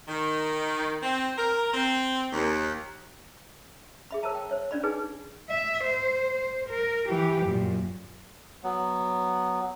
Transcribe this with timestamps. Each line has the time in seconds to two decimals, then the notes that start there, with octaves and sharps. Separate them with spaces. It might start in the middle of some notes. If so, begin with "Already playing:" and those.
0.08 D#3
1.03 C4
1.38 A#4
1.73 C4
2.33 D#2
4.11 G#4 E5 B5
4.22 A#4 C5 C#5 E5 A5 A#5
4.35 G5
4.50 C5 C#5 E5
4.71 C#4 D4 D5 B5
4.83 D#4 G#4 B4 G#5
5.50 E5
5.84 C5
6.35 C5
6.70 A#4
7.09 E3 G4
7.47 F#2 A#2
8.63 F#3 B3